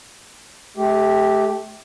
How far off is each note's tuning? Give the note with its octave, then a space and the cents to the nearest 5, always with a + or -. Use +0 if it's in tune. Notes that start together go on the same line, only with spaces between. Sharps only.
A3 -30 G4 +0